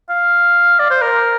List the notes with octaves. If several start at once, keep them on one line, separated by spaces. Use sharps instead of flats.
F5
D5
C5
A#4